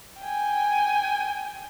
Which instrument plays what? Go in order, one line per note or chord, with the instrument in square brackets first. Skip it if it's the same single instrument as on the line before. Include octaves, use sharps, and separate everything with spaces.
[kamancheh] G5 G#5